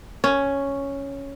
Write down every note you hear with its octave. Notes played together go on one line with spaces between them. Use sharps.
C#4